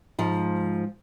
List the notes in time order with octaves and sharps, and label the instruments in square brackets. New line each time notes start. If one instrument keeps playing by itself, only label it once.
[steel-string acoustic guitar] G#2 F3